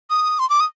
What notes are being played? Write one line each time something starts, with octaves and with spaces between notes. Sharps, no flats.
D#6
C6
D6
D#6